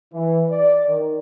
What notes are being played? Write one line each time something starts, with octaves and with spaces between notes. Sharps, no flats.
E3
D5
D#3